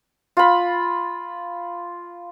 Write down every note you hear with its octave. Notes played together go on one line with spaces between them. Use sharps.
F4 B5